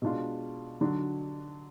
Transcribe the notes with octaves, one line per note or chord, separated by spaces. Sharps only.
B2 G#3 D4 F4
D3 F#3 D4 F#4